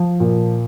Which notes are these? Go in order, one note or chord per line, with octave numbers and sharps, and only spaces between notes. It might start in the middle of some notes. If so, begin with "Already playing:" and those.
Already playing: F3
A#2